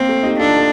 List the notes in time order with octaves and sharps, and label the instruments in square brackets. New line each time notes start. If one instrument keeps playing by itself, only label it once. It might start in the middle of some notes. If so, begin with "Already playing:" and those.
Already playing: [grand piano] A#3 [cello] C4
[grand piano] A3
D#4 G4
[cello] D4 [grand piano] F4 A4
[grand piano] A4